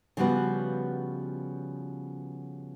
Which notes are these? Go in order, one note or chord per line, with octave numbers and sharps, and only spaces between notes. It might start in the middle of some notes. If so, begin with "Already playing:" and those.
C#3 F3 G3 B3 F#4 B4